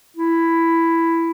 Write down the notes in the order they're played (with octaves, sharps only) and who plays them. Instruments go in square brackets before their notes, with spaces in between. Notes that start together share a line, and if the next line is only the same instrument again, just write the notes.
[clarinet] E4